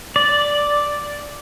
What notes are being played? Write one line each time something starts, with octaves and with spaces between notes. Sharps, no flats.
D5